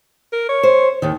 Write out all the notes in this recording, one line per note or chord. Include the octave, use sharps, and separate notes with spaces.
A#4
C#5
C5
D#2 D#3